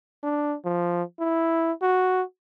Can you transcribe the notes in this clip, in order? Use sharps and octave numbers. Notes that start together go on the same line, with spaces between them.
D4
F3
E4
F#4